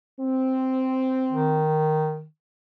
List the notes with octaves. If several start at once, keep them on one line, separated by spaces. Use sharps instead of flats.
C4
D#3